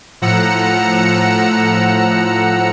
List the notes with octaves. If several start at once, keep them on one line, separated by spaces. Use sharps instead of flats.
A2 F3 F#5 A#5 E6 C#7